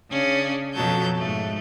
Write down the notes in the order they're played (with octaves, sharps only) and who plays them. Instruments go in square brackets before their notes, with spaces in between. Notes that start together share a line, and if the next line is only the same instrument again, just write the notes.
[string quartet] C#3 C#4 D4
F2 B2 F#3 A5 G6
G#2 A3